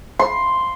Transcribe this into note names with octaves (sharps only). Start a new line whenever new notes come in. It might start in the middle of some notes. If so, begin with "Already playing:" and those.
C6